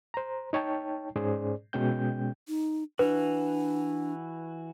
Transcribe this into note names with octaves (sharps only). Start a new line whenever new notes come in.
C5 A#5
D#4 C#5 G5 A5
G#2 C#4 G#4 C5 D5
B2 G#3 C#4 G5 G6
D#4
E3 D4 F#4 B4